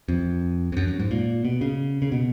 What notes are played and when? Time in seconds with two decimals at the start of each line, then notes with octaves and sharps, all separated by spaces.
0.09 F2
0.72 F2
0.77 F#2
0.88 F#2
1.00 G#2
1.11 A#2
1.45 B2
1.61 C#3
2.02 C#3
2.12 B2